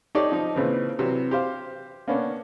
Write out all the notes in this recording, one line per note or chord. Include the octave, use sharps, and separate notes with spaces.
D#4 G4 A4 C#5 D5
F3 D#4
A#2 C#3 E3 C4
C3 E3 F#3
G4 C5 F5
A#3 B3 C#4 D4